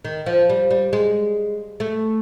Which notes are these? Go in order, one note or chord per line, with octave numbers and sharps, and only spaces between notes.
D#3
F3
G3
G3
G#3
A3